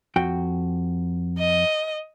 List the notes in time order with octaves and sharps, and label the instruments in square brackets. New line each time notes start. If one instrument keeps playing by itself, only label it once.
[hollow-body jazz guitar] F2 F#4 G5
[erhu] D#5